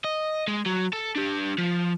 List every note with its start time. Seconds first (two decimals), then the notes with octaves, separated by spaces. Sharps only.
0.04 D#5
0.47 G#3
0.66 F#3
0.93 A4 A5
1.16 D4 G4
1.58 F3